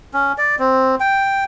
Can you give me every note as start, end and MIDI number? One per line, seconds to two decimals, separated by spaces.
0.14 0.33 61
0.38 0.56 74
0.59 0.95 60
1.00 1.44 79